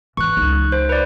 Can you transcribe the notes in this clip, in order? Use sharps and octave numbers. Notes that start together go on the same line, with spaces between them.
E3 C#6 F#6
C#2 D#4
C5
B4 D5